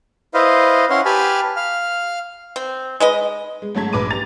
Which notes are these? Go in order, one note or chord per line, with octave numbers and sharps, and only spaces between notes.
E4 B4 C5 D#5 F5
C#4 E4 C#5 F5 F#5 C6
G4 B4 G#5 A5 B5 F6
F5 F6
C4
G#3 B4 D#5
G#3
G#2 F#3 A3 A5 G#6 B6
A#1 B4 D6 D#7
G4 A#5 A6 F7